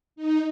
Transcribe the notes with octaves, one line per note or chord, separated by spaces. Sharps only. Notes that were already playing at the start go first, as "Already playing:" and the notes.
D#4